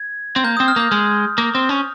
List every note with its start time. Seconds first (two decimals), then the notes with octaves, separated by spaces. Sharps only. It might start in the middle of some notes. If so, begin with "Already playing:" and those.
Already playing: G#6
0.36 C4
0.44 A#3 G6
0.57 C4 D#6
0.68 F6
0.76 A#3 G6
0.92 G#3
1.38 A#3
1.55 C4
1.69 C#4